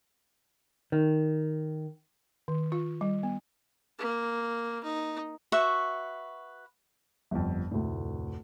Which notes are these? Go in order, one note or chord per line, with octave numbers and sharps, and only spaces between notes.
D#3
D#3
F4
G3
B3
A#3
D#4
F#4 B4 E5 C#6
G1 F2
F1 D2 A2